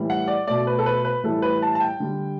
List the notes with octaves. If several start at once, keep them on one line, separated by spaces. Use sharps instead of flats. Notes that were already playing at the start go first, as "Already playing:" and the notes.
Already playing: A2 E3 G3
F#5
D5
B2 A3 D5
B4
A4
B4
B4
A2 E3 G3 A4
B4
A5
A5
G5
D3 G3